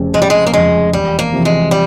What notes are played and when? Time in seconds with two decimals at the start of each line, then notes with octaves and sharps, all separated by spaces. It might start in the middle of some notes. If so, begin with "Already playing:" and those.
Already playing: F1 F2 C#3
0.14 F1 G#3
0.22 G3
0.30 G#3
0.47 A#3
0.53 F2 C#3 G#3
0.93 E1 G3
1.19 A#3
1.32 E2 C3 F3
1.45 G#3
1.71 G3